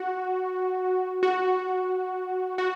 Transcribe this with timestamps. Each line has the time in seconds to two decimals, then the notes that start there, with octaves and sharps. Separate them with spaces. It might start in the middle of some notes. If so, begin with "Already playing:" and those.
Already playing: F#4
1.23 F#4
2.58 F#4